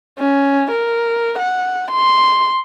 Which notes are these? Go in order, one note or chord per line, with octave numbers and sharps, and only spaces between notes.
C#4
A#4
F#5
C6